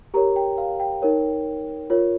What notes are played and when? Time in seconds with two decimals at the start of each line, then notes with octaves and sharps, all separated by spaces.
0.14 G4 A#4 C#5 A#5
0.36 G5
0.58 F5
0.80 G5
1.02 D#4 A#4 C#5
1.90 F4 A#4 C#5